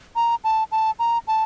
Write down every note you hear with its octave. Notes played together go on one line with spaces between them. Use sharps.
A#5
A5
A5
A#5
A5